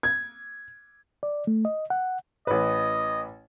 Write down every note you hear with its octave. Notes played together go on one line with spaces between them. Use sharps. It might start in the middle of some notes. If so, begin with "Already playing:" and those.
G#6
D5
A3
D#5
F#5
A1 B4 D#5